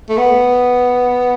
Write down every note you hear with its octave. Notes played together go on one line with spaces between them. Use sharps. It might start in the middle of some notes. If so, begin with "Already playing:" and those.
A3
B3